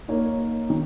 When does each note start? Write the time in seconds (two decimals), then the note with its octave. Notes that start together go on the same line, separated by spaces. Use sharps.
0.08 A#3 D#4 A#4 C#5
0.70 D#3